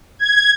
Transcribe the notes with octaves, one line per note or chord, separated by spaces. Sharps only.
G#6